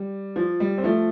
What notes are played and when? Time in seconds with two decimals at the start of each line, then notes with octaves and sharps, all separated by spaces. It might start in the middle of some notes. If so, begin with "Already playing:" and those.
Already playing: G3
0.36 F3
0.60 G3
0.78 C4
0.84 F3 A3